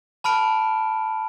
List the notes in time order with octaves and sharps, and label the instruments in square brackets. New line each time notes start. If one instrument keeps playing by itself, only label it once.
[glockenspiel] A5 B5 F6 D7